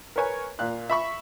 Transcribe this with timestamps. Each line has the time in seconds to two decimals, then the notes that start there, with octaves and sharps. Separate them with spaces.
0.16 A#4 B4 C#5 G#5
0.59 A#2 F5 F#6
0.90 E5 B5 C#6